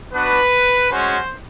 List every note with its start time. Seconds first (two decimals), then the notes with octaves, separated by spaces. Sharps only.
0.13 B3 D4 F#4 B4
0.90 G#3 C#4 F#4 C5